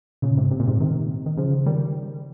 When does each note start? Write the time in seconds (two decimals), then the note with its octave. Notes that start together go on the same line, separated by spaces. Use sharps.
0.22 A#2 C#3
0.37 G#2 C3
0.51 C3
0.60 A#2
0.68 G#2 C3
0.80 C3 D#3
1.26 D#3
1.37 C#3 F3
1.66 D#3 G3